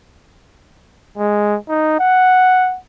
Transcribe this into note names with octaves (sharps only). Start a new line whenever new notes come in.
G#3
D#4
F#5